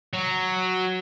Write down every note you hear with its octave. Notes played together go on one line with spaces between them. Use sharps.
F#3